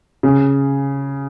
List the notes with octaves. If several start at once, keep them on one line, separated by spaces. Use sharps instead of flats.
C#3